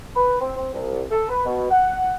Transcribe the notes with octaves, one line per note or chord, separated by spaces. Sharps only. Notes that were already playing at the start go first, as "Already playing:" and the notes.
B4
C4
C4
C2
A4
B4
B2
F#5